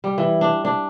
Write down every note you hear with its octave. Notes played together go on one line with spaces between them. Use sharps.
G3
E3
D4
D4